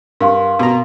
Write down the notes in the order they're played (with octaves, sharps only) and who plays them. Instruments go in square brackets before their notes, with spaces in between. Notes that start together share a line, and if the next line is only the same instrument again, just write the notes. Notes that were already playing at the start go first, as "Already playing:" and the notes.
[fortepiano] G2 [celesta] A#4 F5 C6
[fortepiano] B2 A#5